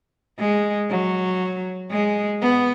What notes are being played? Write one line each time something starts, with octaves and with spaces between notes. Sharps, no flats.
G#3
F#3
G#3
B3